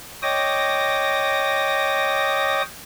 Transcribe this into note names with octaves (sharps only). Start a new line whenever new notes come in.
C#5 D#5 G5 D6 D#6 A#6